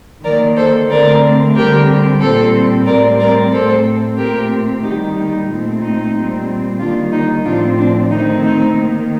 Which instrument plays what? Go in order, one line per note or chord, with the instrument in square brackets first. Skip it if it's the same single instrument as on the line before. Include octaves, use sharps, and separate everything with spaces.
[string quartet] D#3 A#3 A#4 D5
A4 C5
D3 A3 C4 A#4 D5
D3 G3 C4 G4 A#4
A#2 G3 C4 A4 C5
A2 G3 C4 A#4 D5
A#4 D5
A2 A3 C4 A4 C5
A#2 A3 C4 G4 A#4
D#3 G3 A#3 D#4 G4
D#4
A#2 A3 C4
D#4
A#2 G3 C4
D#3 G3 A#3 D4 F4
D#4
A2 F3 C4 D4 F4
D4
D#3 A3 C4 D#4
D#4
D#3 A#3